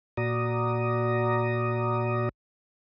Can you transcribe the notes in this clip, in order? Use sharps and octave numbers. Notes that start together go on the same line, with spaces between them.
A#2 F#4 D5 A#5 D#6